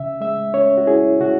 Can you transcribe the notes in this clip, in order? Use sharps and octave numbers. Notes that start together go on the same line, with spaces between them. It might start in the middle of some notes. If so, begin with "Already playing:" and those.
Already playing: C#3 E5
G#3 E5
C#4 C#5
F#4
E4 G#4
C#3 F#4